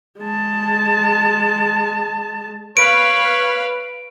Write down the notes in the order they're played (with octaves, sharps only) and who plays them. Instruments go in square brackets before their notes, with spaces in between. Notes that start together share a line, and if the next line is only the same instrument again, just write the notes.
[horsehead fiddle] G#3 A5
[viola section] B4 F5 B5 [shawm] C#5 [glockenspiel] D7